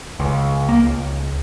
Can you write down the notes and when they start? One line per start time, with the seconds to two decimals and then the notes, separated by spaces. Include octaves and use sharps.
0.20 C#2
0.69 A#3
0.83 C#2